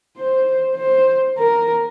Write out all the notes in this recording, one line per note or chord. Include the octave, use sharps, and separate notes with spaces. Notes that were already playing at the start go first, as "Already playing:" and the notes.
C5
C5
A#4